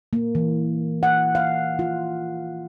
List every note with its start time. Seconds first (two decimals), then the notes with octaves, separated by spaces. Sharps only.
0.13 A#3
0.35 E3
1.03 F#5
1.35 F5
1.79 F4